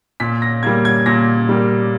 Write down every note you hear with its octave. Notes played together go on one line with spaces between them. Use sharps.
A#2 B6
A#6
G3 A#3 G#6
G#6
A#2 A#6
G3 A#3